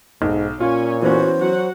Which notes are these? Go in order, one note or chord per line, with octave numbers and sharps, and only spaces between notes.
B1 G#2
A#2 C#4 F4 C#5 G#5
E3 B3 C#4 F#4 C5
F#3 F#4 F#5